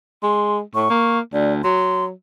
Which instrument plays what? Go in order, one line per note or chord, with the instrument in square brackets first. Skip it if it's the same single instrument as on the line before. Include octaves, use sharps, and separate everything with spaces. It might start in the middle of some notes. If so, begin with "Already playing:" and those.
[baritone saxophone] G#3 [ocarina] C6
[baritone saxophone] A2 [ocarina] C#6
[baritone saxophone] A#3
[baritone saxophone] D2 [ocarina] D5
[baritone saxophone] F#3 [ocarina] C6